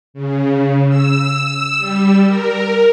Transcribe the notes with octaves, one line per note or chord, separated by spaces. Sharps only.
C#3
E6
G3
A#4